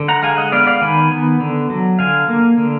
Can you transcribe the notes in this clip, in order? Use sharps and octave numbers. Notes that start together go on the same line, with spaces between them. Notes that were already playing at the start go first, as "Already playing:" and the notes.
Already playing: D3
F#5 A#5
G#3 F5 G#5
D#5 F#5
B3 D5 F5
D5 F5
D#3 G#5 B5
B3
D3
F#3
D3 F5 G#5
A#3
D3